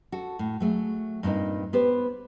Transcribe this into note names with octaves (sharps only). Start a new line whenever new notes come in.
F#4 A4
A2
F#3 A3 G#4
G2 A#2 C4 D#4
B3 G4 B4 C5